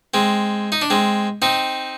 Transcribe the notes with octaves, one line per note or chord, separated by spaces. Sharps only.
G#3 C4
D#4
D4
G#3 C4
C4 D#4